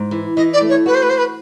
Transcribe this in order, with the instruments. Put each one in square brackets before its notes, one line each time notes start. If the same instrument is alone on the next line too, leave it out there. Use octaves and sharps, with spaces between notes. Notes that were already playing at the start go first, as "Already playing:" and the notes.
Already playing: [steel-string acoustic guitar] G#2
E3
[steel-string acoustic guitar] E3 [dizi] D#5
[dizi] D5
[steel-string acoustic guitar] A3
[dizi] C#5
[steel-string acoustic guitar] F#4 [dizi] B4
[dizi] C5
B4
[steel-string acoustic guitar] F#4 [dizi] C5
[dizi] B4